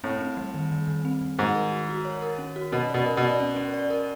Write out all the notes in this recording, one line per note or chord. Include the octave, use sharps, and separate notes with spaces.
A2 C4
C4
G3
D#3
D#3
D#3
C4
D#3
G#2 F#4
A#4
F#4
F#4
C#5
A#4
C#4
F#4
B2 C#4
B2 D5
A#4
B2
D5
C#4
C#4
D5
A#4